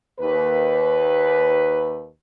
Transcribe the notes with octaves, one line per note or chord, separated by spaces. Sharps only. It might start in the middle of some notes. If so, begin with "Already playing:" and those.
D#2 B4